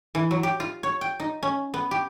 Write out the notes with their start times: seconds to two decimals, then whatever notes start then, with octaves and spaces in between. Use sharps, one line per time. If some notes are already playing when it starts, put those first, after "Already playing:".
0.15 E3
0.31 F#3
0.43 G4
0.60 F4
0.83 C#5
1.01 G5
1.20 D#4
1.43 C#4
1.74 B3
1.91 G4